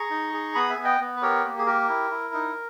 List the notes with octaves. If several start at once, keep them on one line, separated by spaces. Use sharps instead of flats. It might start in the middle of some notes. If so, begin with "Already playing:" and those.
Already playing: G#4 A#5 C#6
D#4
G#4
B3 B5 D#6
E5 G#5
B3
D#5 G5
B3
B4
G4 A#4 C#5
A#3
G#4
G4 A#4
E4
E4
D#4